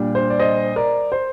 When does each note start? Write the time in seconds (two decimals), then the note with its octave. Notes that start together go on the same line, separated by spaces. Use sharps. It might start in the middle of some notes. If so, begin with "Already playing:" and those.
Already playing: A#2 G3 D4
0.15 C5
0.30 D5
0.39 C5 D#5
0.76 A#4 D5
1.12 C5